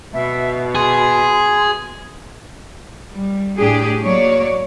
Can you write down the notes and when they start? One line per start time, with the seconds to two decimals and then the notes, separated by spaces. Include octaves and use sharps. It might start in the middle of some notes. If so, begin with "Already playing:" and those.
0.14 B2 E5
0.75 G#4 C6
3.11 G3
3.58 A2 D4 G4 G#4
4.02 F#3 A#3 C#5 D5